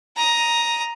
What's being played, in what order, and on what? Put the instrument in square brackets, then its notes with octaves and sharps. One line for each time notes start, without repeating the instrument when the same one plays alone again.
[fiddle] A#5 D#6